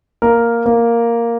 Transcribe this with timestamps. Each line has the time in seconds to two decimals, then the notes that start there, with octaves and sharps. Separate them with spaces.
0.22 A#3 A#4
0.66 A#3